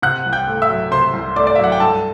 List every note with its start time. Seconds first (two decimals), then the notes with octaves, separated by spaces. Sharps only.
0.02 C3 F#5 F#6
0.26 C2
0.33 G5 G6
0.47 A3
0.62 E5 E6
0.69 F#3
0.91 C3 C5 C6
1.13 C2
1.36 A3 D5 D6
1.47 D5
1.55 F#3 E5
1.64 F#5
1.72 G5
1.80 G2 A4 A5